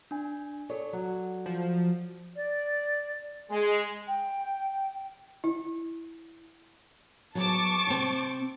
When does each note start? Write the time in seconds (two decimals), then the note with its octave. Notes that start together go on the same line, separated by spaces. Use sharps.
0.11 D4 G#5
0.70 A4 C#5 D5
0.93 F#3
1.46 F3
2.36 D5
3.50 G#3 G#5
4.08 G5
5.44 E4
7.35 E2 F#3 A5 C#6 D6
7.87 C3 C4